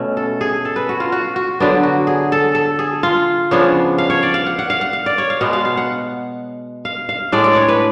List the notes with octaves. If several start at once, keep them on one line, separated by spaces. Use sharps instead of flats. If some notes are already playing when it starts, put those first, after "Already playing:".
Already playing: B2 A3 C#4
A4
G#4
A4
B4
F#4
F4
F#4
F#4
D3 F#3 B3 D4
F#4
G#4
A4
A4
G#4
F4
C#3 F3 B3 D4 C#5
F5
C#5
D5
F5
F#5
F#5
F5
F#5
F5
D5
C#5
F5
B2 G#3 B3 F#5
F5
F5
F#5
F5
F5
A2 G#3 D4 D5
D5
C#5
B4